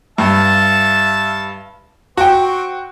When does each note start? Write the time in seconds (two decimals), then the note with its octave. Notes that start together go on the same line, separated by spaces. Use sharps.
0.18 G2 E5 F5 A5
2.17 C4 F#4 G5 C#6